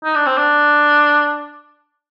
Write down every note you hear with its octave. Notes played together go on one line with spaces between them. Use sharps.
D#4
D4
C4
D4